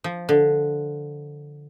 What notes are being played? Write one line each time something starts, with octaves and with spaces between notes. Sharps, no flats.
F3
D3